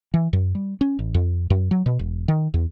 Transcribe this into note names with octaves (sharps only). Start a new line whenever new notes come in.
E3
F#2
G3
C#4
A1
F2
F#2
F#3
B2
E1
D#3
E2